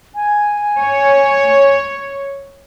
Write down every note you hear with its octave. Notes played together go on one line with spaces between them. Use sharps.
G#5
C#5